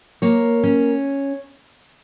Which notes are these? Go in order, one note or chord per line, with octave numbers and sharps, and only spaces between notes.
A#3 C#5
C#4